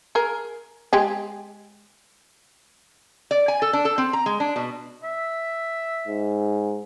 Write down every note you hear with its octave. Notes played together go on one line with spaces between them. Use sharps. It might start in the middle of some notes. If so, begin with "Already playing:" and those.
G#4 A#4
G#3 G4 G#4
D5
G#5
A4
D4
A4
C4
A#5
G#3
D4
B2
E5
G#2